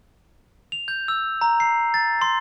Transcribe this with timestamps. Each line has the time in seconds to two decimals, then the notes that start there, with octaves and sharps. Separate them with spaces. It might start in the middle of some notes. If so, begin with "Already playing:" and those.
0.72 F7
0.88 G6
1.08 E6
1.41 A#5
1.60 C7
1.94 A6
2.22 C6